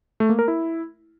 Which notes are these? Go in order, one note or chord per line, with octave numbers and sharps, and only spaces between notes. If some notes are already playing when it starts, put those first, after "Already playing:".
A3
A#3
A#4
E4